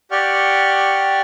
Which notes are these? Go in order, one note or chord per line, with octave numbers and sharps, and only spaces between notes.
G4 D5 F#5 G5 C#6 F6